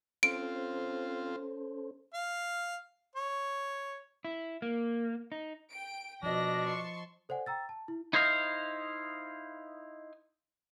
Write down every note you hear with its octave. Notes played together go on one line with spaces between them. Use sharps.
C4 C#4 F4 A4 C5 D7
F5
C#5
E4
A#3
D#4
G5 D7
B2 F3 D4 D#5 A#6
A5 C6 C#6
A4 C5 D5 F#5 G#5
G5 A#5 E6 A6
A5
E4
D#4 E4 C5 D#5 F5